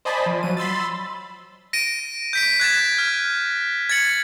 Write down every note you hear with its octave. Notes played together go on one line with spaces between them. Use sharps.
C5 D5 D#5 G#5 A5 B5
F3
F#3 D#7
B5 C6 E6 A6
A#6 D7 D#7
G6 B6 D7
F#6 G#6 A6 E7
F6
G#6 A6 C#7 F#7